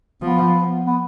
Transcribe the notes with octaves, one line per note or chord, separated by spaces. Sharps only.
F3 B3
B3